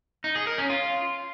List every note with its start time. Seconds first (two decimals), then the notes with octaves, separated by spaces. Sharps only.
0.24 D#4
0.35 G#4
0.47 A#4
0.58 C#4
0.70 F4